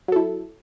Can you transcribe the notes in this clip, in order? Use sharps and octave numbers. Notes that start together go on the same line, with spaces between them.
F#3 E4 A4